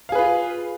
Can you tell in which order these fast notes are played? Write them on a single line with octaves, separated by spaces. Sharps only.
F5 G#4 B4 F4